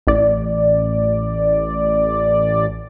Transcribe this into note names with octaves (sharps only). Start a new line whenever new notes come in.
A1 D5